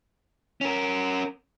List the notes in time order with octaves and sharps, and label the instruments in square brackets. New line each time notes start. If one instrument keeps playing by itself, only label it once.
[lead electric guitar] C#4 A#4